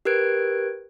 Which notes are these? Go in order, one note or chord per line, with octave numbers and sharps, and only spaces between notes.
G4 A#4 B4 F#6 G#6 D7